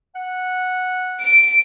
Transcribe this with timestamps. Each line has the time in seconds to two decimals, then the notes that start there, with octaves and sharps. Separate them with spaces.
0.15 F#5
1.20 D7